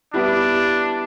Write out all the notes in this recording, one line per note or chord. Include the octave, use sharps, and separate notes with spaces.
G3 B3 D4 E4 G4